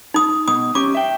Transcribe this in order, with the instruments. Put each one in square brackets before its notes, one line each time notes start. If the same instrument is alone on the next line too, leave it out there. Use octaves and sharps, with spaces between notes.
[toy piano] D#4 D#6
[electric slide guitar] B2 [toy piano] D#6
[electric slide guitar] C#4 G4 [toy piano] D6
[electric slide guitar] E5 G5